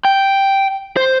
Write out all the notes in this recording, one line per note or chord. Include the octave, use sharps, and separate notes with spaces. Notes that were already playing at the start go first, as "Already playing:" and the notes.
G5
C5